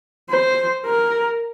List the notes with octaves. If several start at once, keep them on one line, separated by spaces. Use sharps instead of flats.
C5
A#4